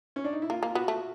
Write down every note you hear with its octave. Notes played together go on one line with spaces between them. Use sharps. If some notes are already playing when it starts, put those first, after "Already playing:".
C#4
D4
D#4
E4
A#3 F4
A#3
F4
B3 F#4
A3